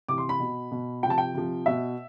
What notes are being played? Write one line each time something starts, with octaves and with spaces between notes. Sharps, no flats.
C3 E3 D6
C6
B5
B2
B2
C3 F3 G5 A5
G5
C3 F3
B2 E5